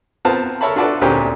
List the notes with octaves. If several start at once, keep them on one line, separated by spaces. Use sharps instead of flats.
B3 C4 F4 A#4 A5
A4 A#4 C#5 E5 A5 B5
D4 F4 F#4 A4 B4 D5
D2 A#2 C4 C#4 G4